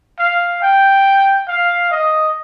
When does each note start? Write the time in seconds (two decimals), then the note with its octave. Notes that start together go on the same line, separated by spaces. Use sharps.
0.19 F5
0.62 G5
1.48 F5
1.91 D#5